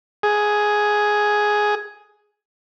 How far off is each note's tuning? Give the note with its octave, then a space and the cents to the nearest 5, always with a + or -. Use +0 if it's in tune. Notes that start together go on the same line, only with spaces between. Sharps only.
G#4 +5